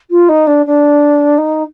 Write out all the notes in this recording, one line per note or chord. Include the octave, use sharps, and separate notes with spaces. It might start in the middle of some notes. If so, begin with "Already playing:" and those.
F4
D#4
D4
D4
D#4